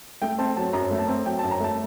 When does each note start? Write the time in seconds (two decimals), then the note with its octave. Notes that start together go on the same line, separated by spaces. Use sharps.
0.22 A3 G5
0.38 C4 A5
0.56 F#3 A5
0.73 F#2 A#5
0.91 A3
0.99 A5
1.08 C4
1.25 F#3 G5
1.39 A5
1.43 F#2
1.51 A#5
1.60 A3 A5